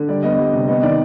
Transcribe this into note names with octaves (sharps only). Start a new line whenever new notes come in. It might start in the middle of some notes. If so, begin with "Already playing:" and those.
Already playing: D3
G3 D5
B3 D#5
G3
C3
B3 D#5
D#3 D5